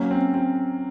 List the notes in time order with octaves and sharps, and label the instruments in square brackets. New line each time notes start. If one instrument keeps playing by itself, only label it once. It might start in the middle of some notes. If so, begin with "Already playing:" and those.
Already playing: [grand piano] F#3 [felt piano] A#3 C#4
[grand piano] C4
C4